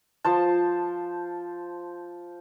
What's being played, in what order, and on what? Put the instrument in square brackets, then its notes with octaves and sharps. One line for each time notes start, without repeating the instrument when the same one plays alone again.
[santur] F3 C5 A5